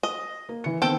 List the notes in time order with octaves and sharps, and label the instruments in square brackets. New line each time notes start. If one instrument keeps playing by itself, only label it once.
[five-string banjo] D#5
[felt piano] A#3
E3 C#7
[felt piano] D#3 B3 C4 [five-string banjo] A4 G5